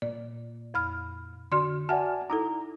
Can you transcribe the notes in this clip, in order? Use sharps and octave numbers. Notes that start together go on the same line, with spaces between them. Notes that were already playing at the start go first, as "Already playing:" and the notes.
A#2 D5
F2 B5 F6
D3 F#4 D5 C6
F#4 D5 E5 F#5 G#5 A5
D#4 E4 A4 A#5